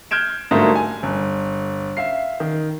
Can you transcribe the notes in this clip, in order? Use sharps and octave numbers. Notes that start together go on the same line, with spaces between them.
F6 G6 G#6 D7 E7
G#2 D3 F#3 G3 A3 A#3
G#5
G1
E5 F5 C7
D#3